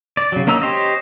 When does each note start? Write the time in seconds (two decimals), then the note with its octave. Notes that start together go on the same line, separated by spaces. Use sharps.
0.17 D5
0.32 C#3 F#3
0.47 A#3 C#4 D#4 A#5 E6
0.62 G4 C5 C#5 D#5